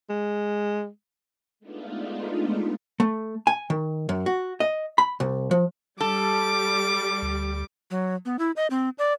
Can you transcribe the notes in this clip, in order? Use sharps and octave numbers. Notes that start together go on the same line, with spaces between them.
G#3
G#3 A3 B3 D4 D#4 F4
A3
G#5
D#3
F#2
F#4
D#5
B5
C2
F3
G3 A4 D6
D2
F#3
B3
E4
D#5
C4
D5